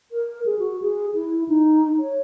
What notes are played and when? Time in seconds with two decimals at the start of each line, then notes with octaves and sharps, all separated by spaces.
0.12 A#4
0.46 G#4
0.59 F#4
0.82 G#4
1.14 E4
1.48 D#4
2.00 C#5